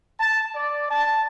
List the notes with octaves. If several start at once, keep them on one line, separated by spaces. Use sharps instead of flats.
A5
D5
A5